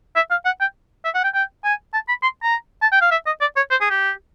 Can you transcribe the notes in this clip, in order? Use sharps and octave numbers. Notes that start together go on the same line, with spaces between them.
E5
F5
F#5
G5
E5
F#5
G5
G5
G#5
A5
B5
C6
A#5
A5
G5
F5
E5
D#5
D5
C#5
C5
G#4
G4